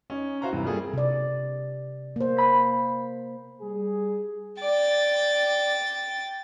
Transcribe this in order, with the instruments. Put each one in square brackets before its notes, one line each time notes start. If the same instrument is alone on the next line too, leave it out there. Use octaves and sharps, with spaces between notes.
[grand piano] C#4 D#4
E4 F#4 C5 F5 A#5 C#6
G2 C3 E3
G3 A#3 F4 G#4 A4
[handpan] C3 D5
A#3 C5
[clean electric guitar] B5
[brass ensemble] G3 G#4
[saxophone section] D5 [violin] G5 A6